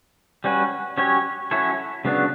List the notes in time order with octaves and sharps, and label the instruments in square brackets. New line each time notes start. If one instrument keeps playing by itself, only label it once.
[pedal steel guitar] G3 C#4 F#4 B4
F#3 C#4 G4 C#5
F#3 C#4 E4 A4 C#5
C#3 F#3 B3 D4